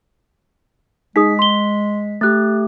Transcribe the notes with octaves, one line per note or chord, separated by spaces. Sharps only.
G#3 D#4 G#4 D#6 B6
C6 G7
A3 G4 F#6 A6